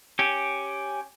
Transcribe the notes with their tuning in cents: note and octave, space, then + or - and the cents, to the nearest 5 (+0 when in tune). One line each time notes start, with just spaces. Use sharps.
C#4 +0 G4 +0